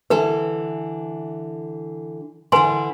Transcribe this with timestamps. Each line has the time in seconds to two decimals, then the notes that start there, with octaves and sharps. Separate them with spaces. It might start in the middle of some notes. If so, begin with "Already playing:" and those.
0.10 D3 E3 A4 B4
2.52 D3 E3 B4 G#5 C6